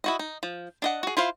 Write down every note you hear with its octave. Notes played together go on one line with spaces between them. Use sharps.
E4 F#4 D#5
D#4
F3
D4 D#5 F#5
F#4 G#4
E4 F4 C5 F5